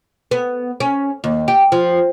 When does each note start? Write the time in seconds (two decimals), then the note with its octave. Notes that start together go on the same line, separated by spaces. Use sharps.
0.31 B3
0.80 C#4
1.24 D#2
1.48 G4
1.72 F3